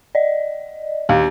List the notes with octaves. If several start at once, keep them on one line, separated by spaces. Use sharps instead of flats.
D5 D#5
D#2 D4 F5